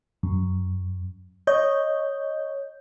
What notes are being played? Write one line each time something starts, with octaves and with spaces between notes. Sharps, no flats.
F#2
C#5 D#5 G6